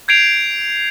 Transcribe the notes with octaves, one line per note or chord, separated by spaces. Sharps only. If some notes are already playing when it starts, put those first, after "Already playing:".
G6 G#6 C7 D7 F7